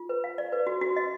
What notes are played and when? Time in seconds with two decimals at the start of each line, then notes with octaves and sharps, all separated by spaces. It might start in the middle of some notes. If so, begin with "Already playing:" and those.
Already playing: F4
0.09 B4
0.24 F5
0.38 D5
0.52 B4
0.67 F#4
0.81 F#4
0.96 D#5